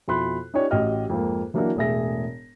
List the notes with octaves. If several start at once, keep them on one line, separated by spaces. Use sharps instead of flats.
F2 B2 E4 B5 C6 F#6
C#4 D#4 F4 G4 C#5 D5
A1 F#4 G4 D#5 F6
F2 G#2 A#3
E3 F#3 A#3 D4 E4 F#4
E1 A2 G#4 E5 A#6